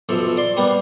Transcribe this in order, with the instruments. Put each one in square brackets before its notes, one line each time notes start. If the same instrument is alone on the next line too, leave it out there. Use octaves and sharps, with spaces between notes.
[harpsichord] B1 F#2 F3 A4
D5 C6
G3 A#3 B3